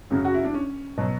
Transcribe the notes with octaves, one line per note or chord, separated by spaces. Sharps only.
F#2 C#3 F#3
F#4
E4
D4
C#4
B2 F#3